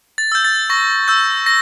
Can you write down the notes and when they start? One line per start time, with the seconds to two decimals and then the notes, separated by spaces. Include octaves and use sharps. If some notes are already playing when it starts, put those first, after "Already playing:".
0.18 A6
0.32 E6 G6
0.45 A6
0.70 C#6 A#6
1.08 E6 G6
1.46 A#6